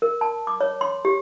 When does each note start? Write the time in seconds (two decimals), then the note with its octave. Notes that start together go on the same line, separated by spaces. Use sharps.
0.02 A#4
0.21 A5
0.47 D6
0.61 C#5
0.81 C6
1.05 G4